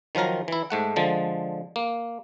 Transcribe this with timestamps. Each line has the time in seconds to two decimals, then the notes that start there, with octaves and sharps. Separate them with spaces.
0.15 D#3 F3 F#3 A#4 A#5
0.48 E3 E4
0.70 G#2 A3 F#5
0.96 D3 F3 G#3
1.76 A#3